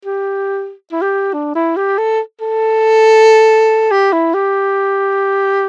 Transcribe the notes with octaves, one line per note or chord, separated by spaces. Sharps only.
G4
E4
G4
D4
E4
G4
A4
A4
G4
E4
G4